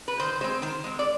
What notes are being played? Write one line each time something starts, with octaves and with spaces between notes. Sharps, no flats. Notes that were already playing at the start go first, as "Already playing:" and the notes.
B4
D#3 C5
G#3 C4 C5
D#3 C5
G#3 C4
D5